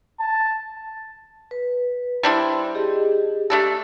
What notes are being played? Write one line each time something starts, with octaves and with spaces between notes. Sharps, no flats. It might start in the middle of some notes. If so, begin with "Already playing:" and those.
A5
B4
G3 D4 E4 C5 C6
G4 G#4 D#5
A3 D4 G4 A4